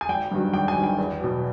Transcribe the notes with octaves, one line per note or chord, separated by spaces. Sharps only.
G#5
G#1 G5
G2 D#3 F#3
G#1 G5
G#5
G2 D#3 F#3
G5
E2
B2 F#3